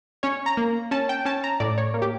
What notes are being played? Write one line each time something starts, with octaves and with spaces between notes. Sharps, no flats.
C#4 C#5
A#5
A#3
C#4 A5
G5
C#4 A5
A#5
A2 D5
C#5
A#3
G4